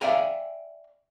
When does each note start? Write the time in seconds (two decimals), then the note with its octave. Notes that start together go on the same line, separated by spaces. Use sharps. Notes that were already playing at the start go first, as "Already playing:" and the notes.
0.01 D5 E5 F5 G5 G#5 A#5